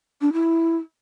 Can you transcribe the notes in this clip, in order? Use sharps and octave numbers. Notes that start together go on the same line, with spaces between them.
D4
E4